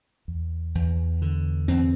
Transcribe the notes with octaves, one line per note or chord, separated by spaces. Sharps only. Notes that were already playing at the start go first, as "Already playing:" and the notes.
E2
E2
D3
E2 C4